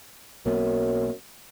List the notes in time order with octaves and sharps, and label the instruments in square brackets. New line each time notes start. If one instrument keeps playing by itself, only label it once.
[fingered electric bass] B1 A#3 B3 [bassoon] F#2